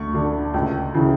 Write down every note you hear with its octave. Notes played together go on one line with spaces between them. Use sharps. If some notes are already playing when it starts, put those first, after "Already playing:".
Already playing: D2 C#6
D3
C#2
C#3 E3